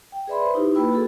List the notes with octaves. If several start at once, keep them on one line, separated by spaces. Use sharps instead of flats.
G5
G#4 B4 D5 E5 B5 C6
B4 C5
D#4 E4 G4
A#3 F4 B4 G5 B5 E6
F#4 G#4 A4